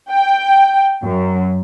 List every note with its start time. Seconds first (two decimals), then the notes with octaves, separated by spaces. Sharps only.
0.11 G5
1.03 F#2